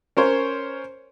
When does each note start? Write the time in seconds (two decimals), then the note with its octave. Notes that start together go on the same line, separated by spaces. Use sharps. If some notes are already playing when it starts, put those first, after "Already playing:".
0.17 C#4 A#4 C5 C#5